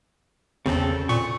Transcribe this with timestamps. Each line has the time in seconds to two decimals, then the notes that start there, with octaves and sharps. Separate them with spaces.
0.66 G#1 E2 C#3 C4 A4
1.09 A#2 C#6